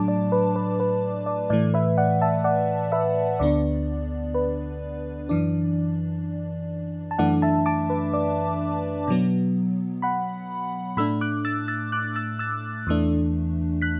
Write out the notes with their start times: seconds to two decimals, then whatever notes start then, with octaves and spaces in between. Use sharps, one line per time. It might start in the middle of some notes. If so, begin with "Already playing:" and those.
Already playing: A2 F#3 A3 D4 A5 D6
0.08 D5
0.32 B4
0.56 B4
0.80 B4
1.26 D5
1.50 A2 E3 A3 D5
1.74 B4 E5
1.98 D5 F#5
2.22 E5 A5
2.44 D5 F#5
2.92 B4 E5
3.39 D2 D3 B3 D4 D5
4.35 B4
5.29 F#2 E3 D4 D5
7.11 A5
7.18 F#2 E3 A3 D4 D5 F#5
7.42 E5 A5
7.66 A5 D6
7.90 B4
8.13 D5
9.08 B2 F#3 B3
10.02 F#5 B5
10.97 A2 A3 D4 B5 E6
11.21 D6 F#6
11.45 E6 A6
11.68 E6 A6
11.92 D6 F#6
12.16 E6 A6
12.39 E6 A6
12.87 E2 E3 A3 D4
13.82 F#6 B6